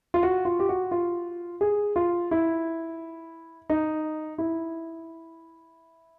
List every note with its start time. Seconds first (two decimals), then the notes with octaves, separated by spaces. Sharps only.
0.14 F4
0.23 F#4
0.45 F4
0.59 G4
0.69 F#4
0.91 F4
1.61 G#4
1.96 F4
2.31 E4
3.70 D#4
4.38 E4